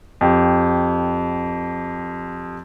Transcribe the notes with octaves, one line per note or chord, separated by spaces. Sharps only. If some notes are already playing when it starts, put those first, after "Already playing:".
F2 G4